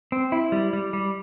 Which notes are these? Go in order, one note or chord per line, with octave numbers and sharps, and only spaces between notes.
C4
E4
G3
G3
G3